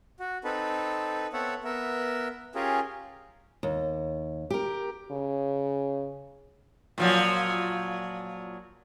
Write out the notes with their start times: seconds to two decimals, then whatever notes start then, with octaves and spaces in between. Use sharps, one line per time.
0.20 F#4
0.44 C4 D#4 A4 B4
1.33 B3 C4 A4 C#5 E5 F#5
1.64 B3 A#4 E5
2.55 C#4 F4 G4 G#4 A#4
3.63 D#2
4.50 G4 A#4
5.11 C#3
6.98 A#2 F3 F#3